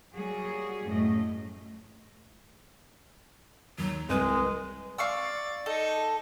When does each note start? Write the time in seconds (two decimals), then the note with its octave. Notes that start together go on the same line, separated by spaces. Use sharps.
0.14 F#3 G3 A#3 F#4 G#4
0.86 F#2 A2 G3 A3 D#5
3.78 D#2 F#3
4.09 C2 G#3 B4
4.98 D5 F5 C#6 E6
5.66 D#4 A4